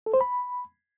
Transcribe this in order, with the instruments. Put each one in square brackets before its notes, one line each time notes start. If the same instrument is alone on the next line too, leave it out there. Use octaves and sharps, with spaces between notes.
[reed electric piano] A4
C5
B5